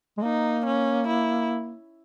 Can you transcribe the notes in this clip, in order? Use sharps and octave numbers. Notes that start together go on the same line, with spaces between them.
G#3
A#3 D#4
C#4
E4